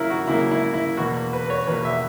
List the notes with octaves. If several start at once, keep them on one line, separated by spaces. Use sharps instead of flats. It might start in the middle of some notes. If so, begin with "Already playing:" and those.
Already playing: C#3 F#3 A#3 E4 A#4
F#4
C#3 F#3 A#3 E4
E4
E4
E2 B2 A#3 F#4
B4
B4
C#5
E2 B2 A#3 B4
E5